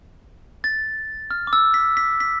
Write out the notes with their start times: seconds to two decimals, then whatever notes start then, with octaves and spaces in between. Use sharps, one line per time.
0.64 A6
1.31 F6
1.47 D6
1.53 E6
1.74 B6
1.97 B6
2.20 B6